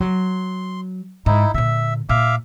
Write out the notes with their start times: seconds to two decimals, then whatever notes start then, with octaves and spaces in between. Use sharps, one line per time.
0.01 F#3 C6
1.26 G#2 D#4 E4
1.54 A#2 D3 E5
2.09 A#2 E5 F5 D6